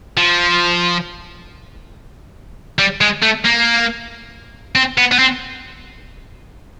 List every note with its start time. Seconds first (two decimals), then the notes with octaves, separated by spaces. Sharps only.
0.17 F3
2.79 G3
3.01 G#3
3.23 A3
3.45 A#3
4.76 C4
4.98 B3
5.12 B3
5.19 C4